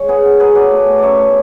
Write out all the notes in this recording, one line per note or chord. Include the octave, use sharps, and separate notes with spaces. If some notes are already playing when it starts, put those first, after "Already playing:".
Already playing: G#3 C#5
B3 G#4 B4
B3
F#3 G#4 B4
F#3 B4 D5
A3
B2
F#2 C#5 D5 E5
A3